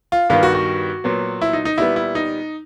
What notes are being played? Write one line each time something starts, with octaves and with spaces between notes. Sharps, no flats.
F4
G2 D#3 G3 B3 F4
F#4
F#4
A#2 F#3 B3
E4
D#4
D#4
A#2 G3 B3 E4
E4
D#4